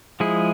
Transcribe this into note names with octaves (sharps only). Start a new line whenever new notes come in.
F3 G#3 E4 G#4